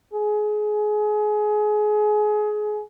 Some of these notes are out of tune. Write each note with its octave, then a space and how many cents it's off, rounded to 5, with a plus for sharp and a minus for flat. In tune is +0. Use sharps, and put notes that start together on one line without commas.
G#4 +25